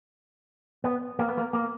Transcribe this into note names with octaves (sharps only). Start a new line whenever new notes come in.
B3
A#3
B3
A#3
A#3